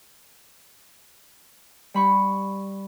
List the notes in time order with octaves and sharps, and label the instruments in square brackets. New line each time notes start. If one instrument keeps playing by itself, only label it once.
[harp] G3 B5 C#6